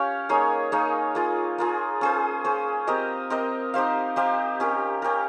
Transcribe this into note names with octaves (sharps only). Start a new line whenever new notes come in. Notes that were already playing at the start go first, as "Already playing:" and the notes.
Already playing: C#4 G4 C#5 F5
A#3 D#4 G#4 C#5
A#3 D#4 G#4 C#5
A#3 F4 G#4
A#3 F4 G#4
C#4 G#4 C5
C#4 G#4 C5
C4 G4 A#4 D#5
C4 G4 A#4 D#5
D#4 G4 C5 F5
D#4 G4 C5 F5
C#4 G4 A#4
C#4 G4 A#4